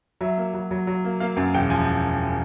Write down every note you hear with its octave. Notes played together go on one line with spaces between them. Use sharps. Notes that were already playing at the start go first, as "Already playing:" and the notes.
F#3 E5
A#3
F#3
F#3
F#3
A#3
A#3 F5
F#2
E1 G5
F3 G#5